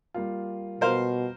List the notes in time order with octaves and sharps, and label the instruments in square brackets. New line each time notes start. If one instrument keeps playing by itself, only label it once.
[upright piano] G3 A#3 F4
[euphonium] B2 [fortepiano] A#4 C5 F5